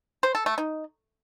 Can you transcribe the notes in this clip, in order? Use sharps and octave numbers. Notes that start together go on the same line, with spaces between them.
C5
A4
A3
D#4